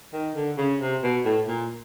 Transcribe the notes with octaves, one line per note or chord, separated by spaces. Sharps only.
D#3
D3
C#3
C3
B2
A2
A#2